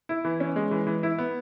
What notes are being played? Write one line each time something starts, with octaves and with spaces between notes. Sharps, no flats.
E4
E3
C#4
G#3
E3
E3
E4
B3